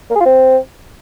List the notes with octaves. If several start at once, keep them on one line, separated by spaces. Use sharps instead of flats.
A#3
G#4
F4
C4